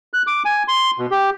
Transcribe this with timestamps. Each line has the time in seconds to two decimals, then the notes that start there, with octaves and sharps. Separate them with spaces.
0.14 F#6
0.27 D6
0.45 G#5
0.68 C6
0.99 B2
1.11 G4